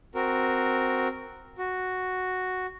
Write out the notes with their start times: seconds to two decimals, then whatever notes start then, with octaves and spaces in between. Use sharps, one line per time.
0.15 C4 F#4 A#4
1.58 F#4